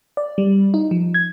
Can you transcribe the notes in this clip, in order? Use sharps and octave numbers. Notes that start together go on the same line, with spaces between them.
D5
G3
D#4
F3
G#6